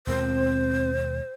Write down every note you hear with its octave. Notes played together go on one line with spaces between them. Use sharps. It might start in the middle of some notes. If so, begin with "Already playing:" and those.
D#2 B2 F3 G#3 C4 A#4 C5